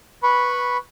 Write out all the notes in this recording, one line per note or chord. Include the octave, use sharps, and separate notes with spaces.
B4 B5 C#6